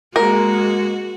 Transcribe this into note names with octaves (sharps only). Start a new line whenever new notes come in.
G#3 A#3 F#4 A#4